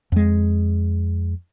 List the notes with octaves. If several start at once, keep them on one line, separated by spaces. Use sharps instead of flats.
F2 G#3